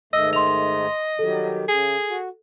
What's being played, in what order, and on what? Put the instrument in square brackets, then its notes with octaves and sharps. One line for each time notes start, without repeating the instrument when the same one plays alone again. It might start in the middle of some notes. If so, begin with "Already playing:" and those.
[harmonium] G#2 D#3 A3 [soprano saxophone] D#5 [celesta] E6
[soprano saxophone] D#5 [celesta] C6 F7
[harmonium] D#3 F#3 G3 [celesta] A4
[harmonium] C#3 [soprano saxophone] G#4
[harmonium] F#4